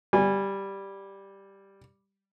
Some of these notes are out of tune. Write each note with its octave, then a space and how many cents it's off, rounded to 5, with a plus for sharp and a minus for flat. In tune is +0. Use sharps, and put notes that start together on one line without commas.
G3 +0 G#5 -30